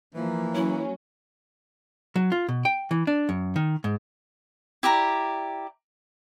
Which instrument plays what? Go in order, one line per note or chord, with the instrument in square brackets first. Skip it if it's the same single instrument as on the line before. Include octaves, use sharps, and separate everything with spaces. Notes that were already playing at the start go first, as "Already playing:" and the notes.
[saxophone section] E3 [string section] F3 [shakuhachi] A#3
[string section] F#3 C#4 [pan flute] E4
[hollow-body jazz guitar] F#3
F4
B2
G5
E3
D4
F#2
D#3
G#2
[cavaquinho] E4 G4 D5 A#5